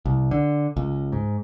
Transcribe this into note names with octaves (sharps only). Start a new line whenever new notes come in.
C2
D3
C#2
G#2